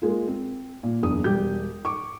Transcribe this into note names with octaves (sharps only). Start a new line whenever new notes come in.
G#3 A#3 F4
C4
A#2
F#1 E2 D4 D#6
E1 G3 G4 G6
C#6 D6